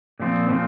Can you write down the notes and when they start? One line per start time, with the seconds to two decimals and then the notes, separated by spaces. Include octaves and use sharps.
0.19 A#2 F3 C4
0.49 A#2 F3 C4